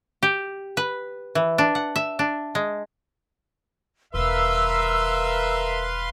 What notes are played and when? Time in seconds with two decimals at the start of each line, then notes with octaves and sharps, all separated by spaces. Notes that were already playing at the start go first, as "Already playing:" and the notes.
0.23 G4
0.77 B4
1.35 E3
1.58 D4
1.75 F#5
1.96 E5
2.19 D4
2.55 G#3
4.14 E1 D#3 A#4 B4 E5 F5 C6 E6